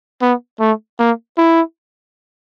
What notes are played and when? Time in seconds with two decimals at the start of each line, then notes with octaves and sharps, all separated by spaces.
0.22 B3
0.60 A3
1.00 A#3
1.38 E4